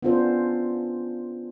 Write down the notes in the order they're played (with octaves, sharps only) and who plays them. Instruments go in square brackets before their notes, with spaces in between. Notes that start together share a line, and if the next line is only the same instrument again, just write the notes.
[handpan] B3 C#4 D4 F4 A4 C5